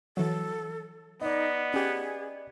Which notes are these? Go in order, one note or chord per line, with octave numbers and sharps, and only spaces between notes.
E3 F#3 A4
B3 D#4 D5 D#5
C#4 G4 G#4